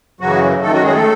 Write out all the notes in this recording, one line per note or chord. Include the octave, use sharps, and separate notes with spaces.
F#2 C#3 E3 F#3 F#4
F#2 D#3 A3 A4
F#3 F#4
G#3 G#4
A3 A4